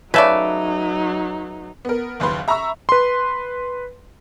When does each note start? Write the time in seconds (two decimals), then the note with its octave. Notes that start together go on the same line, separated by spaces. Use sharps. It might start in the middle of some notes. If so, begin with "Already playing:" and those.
0.14 C#3 F#3 A3 D#4 B4 D5 E5
1.85 B3 A#4
2.20 F#1 D#2 B4 C6
2.48 E5 A#5 B5 C#6 E6
2.89 B4 C6